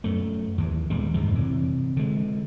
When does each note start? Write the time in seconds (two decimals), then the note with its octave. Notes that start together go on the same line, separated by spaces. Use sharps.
0.04 F#2 A3
0.58 D#2 E3
0.90 D#1 E2 G3 G#3
1.14 F2 G#2 D#3 F3
1.35 C3 E3
1.97 D3 G#3